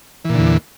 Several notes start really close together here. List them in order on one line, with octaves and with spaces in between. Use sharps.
E3 A#2 D3 E2